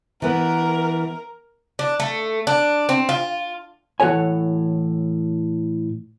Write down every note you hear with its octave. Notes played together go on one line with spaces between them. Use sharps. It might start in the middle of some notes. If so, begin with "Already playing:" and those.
E3 B3 A#4
D4
A3
D4
C4
F4
A2 E3 F#4 A4 C#5 G#5